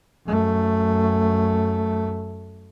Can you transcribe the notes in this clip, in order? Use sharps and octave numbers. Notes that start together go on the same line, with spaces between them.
F#2 A3